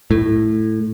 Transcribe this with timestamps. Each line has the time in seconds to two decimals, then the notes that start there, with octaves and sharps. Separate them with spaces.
0.11 A2